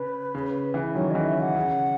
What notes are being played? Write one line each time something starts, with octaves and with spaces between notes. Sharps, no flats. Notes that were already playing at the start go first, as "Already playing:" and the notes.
Already playing: C#3 B4
C#3
C#3 E3
D#3 F#3 C#5
C#3 E3 D#5
E5
F#5
C#3